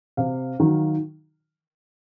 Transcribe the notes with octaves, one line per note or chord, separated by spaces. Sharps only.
C3 F5
D#3 F#3